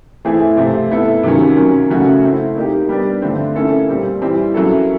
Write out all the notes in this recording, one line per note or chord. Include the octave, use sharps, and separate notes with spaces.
E3 A3 C4 E4 G#4
C3 F3 A3 C4
B3 E4 A4
C3 D#3 F#3 A#3 C#4
F#3 A#3 C#4
C#3 F#3 A3 C#4 F#4
A3 C4 E4
A#3 D#4 G4
G3 B3 D4 G4
D3 F3 A3 C4
A#3 C#4 E4 A4
A#2 G3 C4
E3 G3 C4
F#3 A#3 C#4 E4 A4